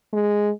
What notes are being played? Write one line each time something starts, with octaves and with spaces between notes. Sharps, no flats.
G#3